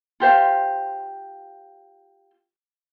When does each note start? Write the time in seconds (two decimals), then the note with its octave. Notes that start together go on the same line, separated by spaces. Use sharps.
0.20 F4 G4 C5 F5